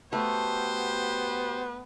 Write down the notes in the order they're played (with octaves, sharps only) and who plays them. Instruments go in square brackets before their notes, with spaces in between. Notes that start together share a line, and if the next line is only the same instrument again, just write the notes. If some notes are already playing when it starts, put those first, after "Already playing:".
[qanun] A3 [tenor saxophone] B3 [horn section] F#4 G4 C5